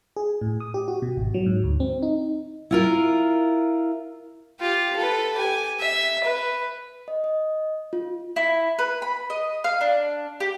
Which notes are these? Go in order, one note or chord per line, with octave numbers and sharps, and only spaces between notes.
G#4
A2
D#6
G4
F#4
B2
G#1
F#3
G#2
D2
C4
D#4
E4 F4 A#4
F4 G4
A4 B4
G4 G#5
E5
B4
D#5
D#5
F4
E4
B4
B5
D#5
F5
D4
G4